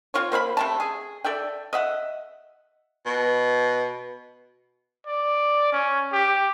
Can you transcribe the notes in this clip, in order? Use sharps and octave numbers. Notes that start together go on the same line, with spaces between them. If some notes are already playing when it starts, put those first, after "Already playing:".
C4 F4 C5 C#5
A#3 C5 E5 B5
C3 A3 A5
G#4
A4 D5 E5 G5
D#5 E5 F#5
B2
D5
C#4
G4